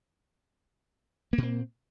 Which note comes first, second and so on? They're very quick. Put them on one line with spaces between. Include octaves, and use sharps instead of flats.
A#3 A#2 C4